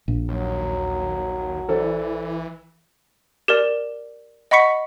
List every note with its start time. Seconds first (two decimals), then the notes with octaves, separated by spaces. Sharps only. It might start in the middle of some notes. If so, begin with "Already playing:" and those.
0.08 A#1
0.29 D#2 F#3
1.69 E3 A4 C5 D5
3.48 G4 A#4 D5
4.51 D#5 F#5 B5 C#6 B6 C#7